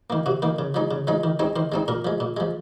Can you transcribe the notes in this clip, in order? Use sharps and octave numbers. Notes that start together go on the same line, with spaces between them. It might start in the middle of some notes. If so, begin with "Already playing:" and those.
D#3 A#3
C3 F#4
D#3 A#3
C#3
F3 G#3 D#4
C#3
F3 G#3 D#4
D#3
G#3 C4 D#4
D#3 C5
G#3 C4 D#4
A#2 A#4
F3 G#3
A#2
F3 G#3